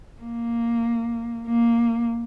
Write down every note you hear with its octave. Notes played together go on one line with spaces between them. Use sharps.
A#3
A#3